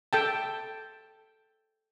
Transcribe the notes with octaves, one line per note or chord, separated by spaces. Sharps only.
A4 G5 A5